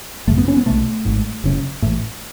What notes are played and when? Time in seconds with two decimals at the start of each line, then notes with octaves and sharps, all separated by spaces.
0.27 G#1 F#2 C#3 A3
0.38 B3
0.48 C#4
0.57 B3
0.66 B1 B2 A3
1.05 G#1 G#2
1.44 F#1 F#2 C#3
1.82 A1 A2